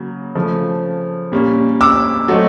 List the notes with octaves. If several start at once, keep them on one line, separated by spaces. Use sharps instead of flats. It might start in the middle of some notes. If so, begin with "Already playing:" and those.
Already playing: C#3 F#3 A#3
C#3 F3 A3
A#2 G3 A#3 C#4
D6 E6
F#3 A3 C4 D#4